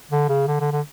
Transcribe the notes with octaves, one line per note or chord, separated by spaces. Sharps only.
D3
C#3
D3
D3
D3